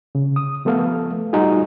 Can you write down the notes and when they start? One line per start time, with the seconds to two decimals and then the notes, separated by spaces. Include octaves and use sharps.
0.15 C#3
0.36 D#6
0.65 F3 A3 B3 A4 F5
1.33 G3 D#4 F4 F#4 G#4